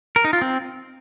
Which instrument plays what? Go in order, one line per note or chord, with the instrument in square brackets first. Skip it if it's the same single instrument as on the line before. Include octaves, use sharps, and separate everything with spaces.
[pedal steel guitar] A#4
D#4
F4
C4